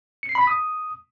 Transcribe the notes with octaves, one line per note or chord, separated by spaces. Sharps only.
C#7
C7
B5
B6
D#6